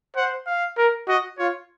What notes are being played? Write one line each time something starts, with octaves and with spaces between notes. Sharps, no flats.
C5 F#5
F5
A#4
F#4 D#5
F4 C#5